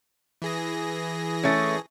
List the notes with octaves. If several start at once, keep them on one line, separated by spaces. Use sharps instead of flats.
E3 G#4 A#6
A3 C#4